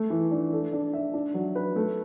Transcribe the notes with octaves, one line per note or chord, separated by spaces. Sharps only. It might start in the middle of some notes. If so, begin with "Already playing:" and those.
Already playing: A3
E3
D4
A4
D4
E5
D4
F#3
B4
A3